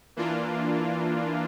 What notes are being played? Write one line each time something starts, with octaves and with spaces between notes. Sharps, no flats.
E3 A#3 D4 F4